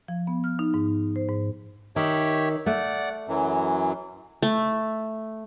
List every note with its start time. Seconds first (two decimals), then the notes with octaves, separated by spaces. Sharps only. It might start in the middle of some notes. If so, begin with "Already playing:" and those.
0.08 F3
0.27 B3
0.44 F6
0.59 D#4
0.74 G#2
1.16 C5
1.29 G#2
1.96 D#3 G4 C#5 E5
2.66 A3 D5 F#5
3.28 F#2 E3 F#3
4.43 A3